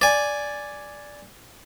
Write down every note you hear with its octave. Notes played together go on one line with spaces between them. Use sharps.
D5 G#5